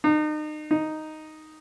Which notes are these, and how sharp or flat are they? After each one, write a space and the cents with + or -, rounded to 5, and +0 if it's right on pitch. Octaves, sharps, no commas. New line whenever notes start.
D#4 -35
D#4 +0